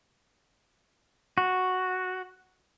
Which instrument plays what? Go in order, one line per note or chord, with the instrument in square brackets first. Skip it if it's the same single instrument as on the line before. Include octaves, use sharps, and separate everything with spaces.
[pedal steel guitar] F#4